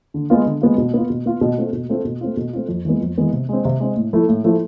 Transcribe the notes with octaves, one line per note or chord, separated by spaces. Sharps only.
D3
G#3 B3 F4
D3
G#3 B3 F4
B2
B3 F4
B2
B3 F4
B2
A3 C4 F4
B2
A3 C4 F4
B2
A3 C4 F4
B2
A3 C4 F4
F2
E3 G#3 B3
F2
E3 G#3 B3
C3
G#3 C4
C3
G#3 C4
A2
F3 A3 E4
A2
F3 A3 E4